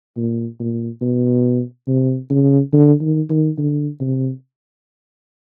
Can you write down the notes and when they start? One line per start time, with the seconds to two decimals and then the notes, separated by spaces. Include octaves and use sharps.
0.17 A#2
0.60 A#2
1.02 B2
1.87 C3
2.30 C#3
2.73 D3
3.01 D#3
3.30 D#3
3.58 D3
4.00 C3